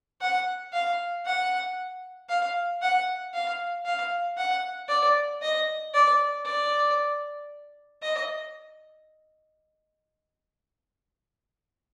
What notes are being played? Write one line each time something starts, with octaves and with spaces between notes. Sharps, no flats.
F#5
F5
F#5
F5
F#5
F5
F5
F#5
D5
D#5
D5
D5
D#5